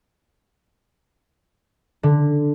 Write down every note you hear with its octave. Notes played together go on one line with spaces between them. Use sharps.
D3